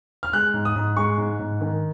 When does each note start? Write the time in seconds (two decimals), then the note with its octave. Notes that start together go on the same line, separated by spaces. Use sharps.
0.23 F6
0.33 G#3 F#6
0.54 G#2
0.65 D#6
0.76 G#2
0.96 G#3 C#6
1.18 G#2
1.39 G#2
1.61 D#3